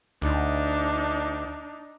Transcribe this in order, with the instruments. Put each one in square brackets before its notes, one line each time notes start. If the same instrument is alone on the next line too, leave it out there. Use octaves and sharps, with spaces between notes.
[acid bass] D2 [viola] D4 D#4